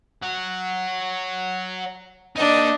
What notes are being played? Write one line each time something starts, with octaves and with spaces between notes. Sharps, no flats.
C#5 F#5
A#3 D4 D#4 D#5